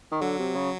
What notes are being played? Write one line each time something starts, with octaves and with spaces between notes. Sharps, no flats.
D#3
D3 F#3
C3
C#3